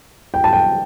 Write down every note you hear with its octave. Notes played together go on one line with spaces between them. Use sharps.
G5
A5
G5